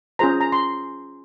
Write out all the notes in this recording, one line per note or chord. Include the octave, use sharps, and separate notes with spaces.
C#4 F4 G#4 C5 A#5
A#5
C6